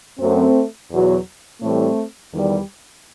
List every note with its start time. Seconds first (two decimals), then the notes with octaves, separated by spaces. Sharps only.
0.19 F#2 F#3 A3 C4
0.91 E2 B2 F#3
1.62 A2 E3 G3 A3 C4
2.33 E2 D#3 G3